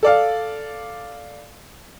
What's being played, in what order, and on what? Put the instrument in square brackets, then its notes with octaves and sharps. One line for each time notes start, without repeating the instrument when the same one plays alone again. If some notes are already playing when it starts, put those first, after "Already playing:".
[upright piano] A4 D5 F5